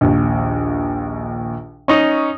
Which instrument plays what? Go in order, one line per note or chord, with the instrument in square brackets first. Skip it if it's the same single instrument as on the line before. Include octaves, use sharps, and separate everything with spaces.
[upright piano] A#1 D#2
[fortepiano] C#4 D#4 [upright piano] C#6 D#6